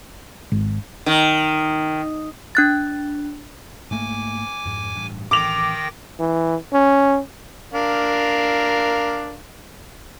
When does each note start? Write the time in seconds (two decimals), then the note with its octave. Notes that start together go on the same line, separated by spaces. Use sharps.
0.52 G#1
1.06 D#3
2.55 D4 F#6 A6
3.91 G#2 A3 A#3 G#5 D6
4.65 F2 G#2
4.95 A1 G2
5.31 A1 D#3 G5 D6 A#6 F7
6.19 E3
6.73 C#4
7.73 D4 A#4 F5